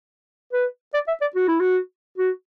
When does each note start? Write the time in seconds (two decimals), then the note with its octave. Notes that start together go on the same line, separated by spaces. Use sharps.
0.53 B4
0.94 D5
1.08 E5
1.21 D5
1.35 F#4
1.48 E4
1.60 F#4
2.18 F#4